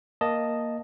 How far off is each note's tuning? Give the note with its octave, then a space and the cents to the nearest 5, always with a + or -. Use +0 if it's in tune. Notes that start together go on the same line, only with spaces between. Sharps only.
A#3 +0 D#5 +0 A5 +0